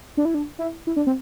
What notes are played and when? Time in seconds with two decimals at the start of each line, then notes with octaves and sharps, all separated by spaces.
0.17 D4
0.25 E4
0.34 D4
0.59 E4
0.87 E4
0.96 D4
1.07 C4